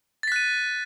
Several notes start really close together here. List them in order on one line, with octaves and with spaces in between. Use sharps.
A6 B6 F#6 D#7